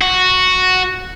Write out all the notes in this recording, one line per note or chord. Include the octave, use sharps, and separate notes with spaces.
F#4